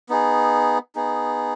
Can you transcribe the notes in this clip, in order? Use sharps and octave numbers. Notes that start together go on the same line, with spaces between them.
B3 D#4 G#4
B3 D#4 G#4